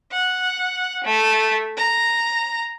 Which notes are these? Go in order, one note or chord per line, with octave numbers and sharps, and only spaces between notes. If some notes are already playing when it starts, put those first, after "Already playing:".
F#5
A3
A#5